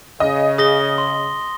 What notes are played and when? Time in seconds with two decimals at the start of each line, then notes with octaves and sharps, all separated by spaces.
0.20 C#3 D#5
0.58 G#4 D#6 A#6 G7
0.98 C6